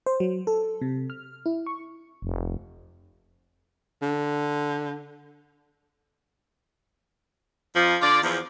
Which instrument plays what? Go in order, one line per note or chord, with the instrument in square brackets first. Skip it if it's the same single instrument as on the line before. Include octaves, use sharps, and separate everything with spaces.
[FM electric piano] C5
F#3
A4
C3
F6
E4
C#6
[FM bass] F1
[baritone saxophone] D3
[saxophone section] F2 F3
D3 F4 D5
E2 F3